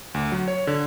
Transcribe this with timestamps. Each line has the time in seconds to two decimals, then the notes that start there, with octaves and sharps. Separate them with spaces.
0.14 D2
0.32 F#3
0.48 C#5
0.67 D3